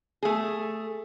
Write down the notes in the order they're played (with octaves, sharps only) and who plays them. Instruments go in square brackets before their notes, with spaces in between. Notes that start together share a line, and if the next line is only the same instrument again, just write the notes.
[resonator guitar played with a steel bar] A3 G#4